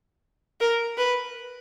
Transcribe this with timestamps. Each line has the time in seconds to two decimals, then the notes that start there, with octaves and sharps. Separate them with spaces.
0.61 A#4
0.98 B4